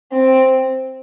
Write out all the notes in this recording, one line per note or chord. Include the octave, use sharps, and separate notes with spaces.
C4